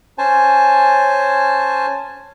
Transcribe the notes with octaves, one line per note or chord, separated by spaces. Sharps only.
C#4 C5 G#5 A5